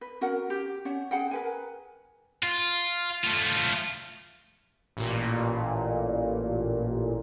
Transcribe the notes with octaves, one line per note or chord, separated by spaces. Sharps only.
B4
C#4 F#4 A#4 F#5
G4
C#4 C#5 F#5
G#4 F#5 G5
A#4 B4 G#5
F4
A3 F4
A1 A#2